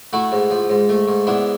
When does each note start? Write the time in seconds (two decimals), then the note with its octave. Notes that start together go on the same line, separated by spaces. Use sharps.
0.13 A3 E4 F#4
0.32 G#2
0.50 F3
0.69 G#2
0.89 A3
1.08 G#2
1.27 B3 D4 E4